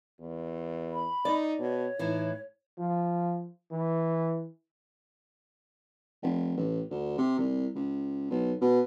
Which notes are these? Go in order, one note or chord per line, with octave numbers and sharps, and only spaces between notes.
E2
B5
D#4 D5
B2 C#5
A2 E3 D#4
F3
E3
F1
A1
D2
C3
C2
C#2
B1
B2